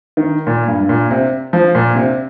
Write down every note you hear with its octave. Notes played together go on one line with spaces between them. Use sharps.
D#3
A#2
G2
G2
A#2
C3
F3
A#2
C3